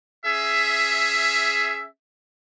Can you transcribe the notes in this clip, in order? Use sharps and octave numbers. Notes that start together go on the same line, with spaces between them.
C#4 G#4 E5